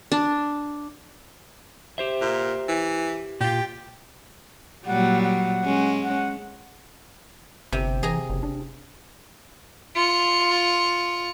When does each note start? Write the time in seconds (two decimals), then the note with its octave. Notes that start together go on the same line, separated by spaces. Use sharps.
0.12 D4
1.98 G4 C5 E5
2.21 A#2
2.68 E3
3.40 A#2 F4 G4
4.86 A#2 F#3 G3 F#5
5.24 F#5
5.65 G#3 C#4
6.03 F#5
7.72 G1 C3
8.03 E3 G#4 A#5
8.30 F#1
8.43 D4
9.96 F4 C#7